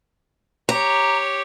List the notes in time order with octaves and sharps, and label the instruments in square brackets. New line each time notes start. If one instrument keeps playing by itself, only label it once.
[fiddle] G4 C#5 [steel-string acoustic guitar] A#5